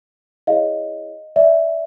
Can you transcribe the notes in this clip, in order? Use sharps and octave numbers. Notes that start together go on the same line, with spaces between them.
E4 G#4 C#5 D#5 F5
D5 E5